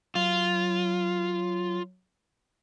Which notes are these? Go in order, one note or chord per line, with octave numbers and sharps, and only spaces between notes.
F#3 F4